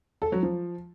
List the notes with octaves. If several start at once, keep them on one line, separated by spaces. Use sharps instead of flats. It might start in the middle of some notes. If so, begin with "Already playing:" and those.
A4
F#3
F3